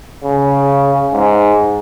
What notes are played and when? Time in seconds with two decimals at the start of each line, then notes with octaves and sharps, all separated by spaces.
0.24 C#3
1.13 G#2